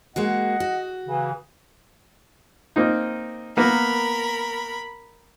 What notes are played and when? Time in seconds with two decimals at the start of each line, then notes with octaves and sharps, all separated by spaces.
0.16 G#3 A#3 F#4 D#5 F#5
0.60 F#4
1.06 C#3 E3
2.76 A#3 C4 D#4
3.57 A#3 B3 A#4 B5